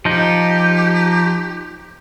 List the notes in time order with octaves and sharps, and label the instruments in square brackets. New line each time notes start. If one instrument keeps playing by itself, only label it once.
[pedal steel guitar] F3 D#4 [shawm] G4